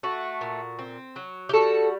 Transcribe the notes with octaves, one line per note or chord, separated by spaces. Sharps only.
A3 F#4
A#2
C4
F#3
G4
G3 F#4 A4